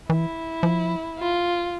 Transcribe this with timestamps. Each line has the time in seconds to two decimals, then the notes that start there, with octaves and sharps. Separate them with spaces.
0.09 E3 E4
0.63 F3
1.19 F4